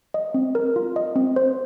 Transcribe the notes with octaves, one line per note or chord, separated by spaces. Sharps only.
D#5
C4
A#4
F4
D#5
C4
C5